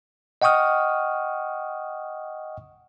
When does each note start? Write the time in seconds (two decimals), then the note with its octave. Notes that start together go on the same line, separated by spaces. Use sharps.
0.42 D#5 F#5 G5 C#6 D#6 F6